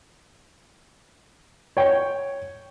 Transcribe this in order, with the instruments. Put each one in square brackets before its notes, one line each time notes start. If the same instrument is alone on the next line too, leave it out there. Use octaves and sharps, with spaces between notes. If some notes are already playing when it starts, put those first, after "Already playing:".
[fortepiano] C#5 G5